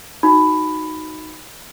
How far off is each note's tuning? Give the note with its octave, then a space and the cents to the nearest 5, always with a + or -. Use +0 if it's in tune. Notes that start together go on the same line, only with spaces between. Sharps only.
D#4 +0 F#4 +0 B5 +10